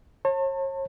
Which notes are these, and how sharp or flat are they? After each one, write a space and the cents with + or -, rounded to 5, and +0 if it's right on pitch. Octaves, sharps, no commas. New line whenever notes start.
C#5 -40 A5 +35